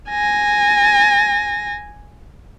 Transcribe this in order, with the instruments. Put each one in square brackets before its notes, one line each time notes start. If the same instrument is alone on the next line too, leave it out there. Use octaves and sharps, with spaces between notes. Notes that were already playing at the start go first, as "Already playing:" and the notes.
[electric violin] G#5 A#6